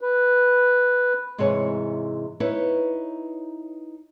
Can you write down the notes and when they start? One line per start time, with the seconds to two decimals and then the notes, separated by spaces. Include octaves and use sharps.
0.01 B4
1.38 G#2 C3 E3 G#4 C#5
2.40 D#4 E4 B4 C#5